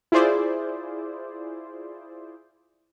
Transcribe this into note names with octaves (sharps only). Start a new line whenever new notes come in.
E4 F4 G#4 C5 D5